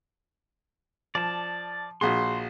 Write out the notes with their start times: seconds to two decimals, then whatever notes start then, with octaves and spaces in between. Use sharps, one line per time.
1.15 F3 D5 A5
2.01 A#1 F#4 G#4 C6